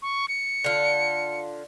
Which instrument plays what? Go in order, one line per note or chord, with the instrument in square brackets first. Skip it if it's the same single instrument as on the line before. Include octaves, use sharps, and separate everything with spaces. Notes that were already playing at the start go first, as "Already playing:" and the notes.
[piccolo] C#6
C#7
[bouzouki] D3 F4